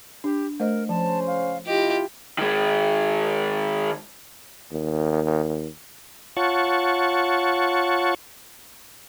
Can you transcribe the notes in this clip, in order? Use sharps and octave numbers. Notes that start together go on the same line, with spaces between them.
D4 G4
A3 A#4 C5 D#5
C#2 F3 C#4 C5 A5
F5
E4 F4 G4 D#5
D#3 G#3
D#2
F4 C#5 F#5 A5 C#6